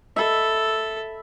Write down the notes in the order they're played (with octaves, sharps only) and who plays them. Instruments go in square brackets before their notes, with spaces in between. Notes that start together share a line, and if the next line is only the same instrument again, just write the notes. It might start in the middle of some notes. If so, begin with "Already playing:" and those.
[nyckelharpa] A4 [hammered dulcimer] E5 B5